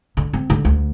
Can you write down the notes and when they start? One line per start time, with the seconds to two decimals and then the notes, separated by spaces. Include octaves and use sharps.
0.17 D3
0.33 C4
0.50 D3
0.65 D2